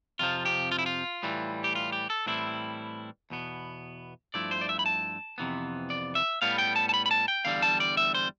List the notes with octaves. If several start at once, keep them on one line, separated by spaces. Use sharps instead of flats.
F2 C3 F3 F4
G4
F4
E4
F4
A2 E3 G3
G4
F4
G4
A4
A2 E3 G3 C4 E4
E2 B2 B3
G2 F3 A3 E4 D5
C5
D5
E5
B5
A5
F2 C3 E3 B3
D5
E5
A2 G3 B3 F5
G5
A5
A5
B5
B5
A5
G5
E2 D3 G3 F5
A5
D5
E5
C5